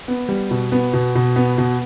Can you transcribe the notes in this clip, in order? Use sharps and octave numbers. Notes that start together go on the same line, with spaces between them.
B3
G3
B2
B3
B2
B2
B3
B2